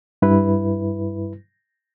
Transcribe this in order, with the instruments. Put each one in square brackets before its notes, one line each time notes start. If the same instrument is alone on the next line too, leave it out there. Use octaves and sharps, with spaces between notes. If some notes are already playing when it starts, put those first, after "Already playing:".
[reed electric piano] G2 E4 B4